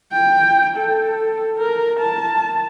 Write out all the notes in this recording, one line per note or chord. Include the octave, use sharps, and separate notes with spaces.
G5
A4
A#4
A5